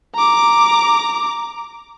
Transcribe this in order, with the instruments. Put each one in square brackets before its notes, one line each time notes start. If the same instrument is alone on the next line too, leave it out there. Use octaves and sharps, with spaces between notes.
[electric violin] A#5 D6